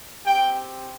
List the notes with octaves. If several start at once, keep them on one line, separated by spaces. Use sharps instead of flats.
C4 G4 G5